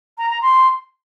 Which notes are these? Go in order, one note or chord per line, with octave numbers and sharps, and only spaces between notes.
A#5
A#5
C6